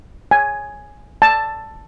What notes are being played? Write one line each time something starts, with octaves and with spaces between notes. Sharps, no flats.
G#5
A5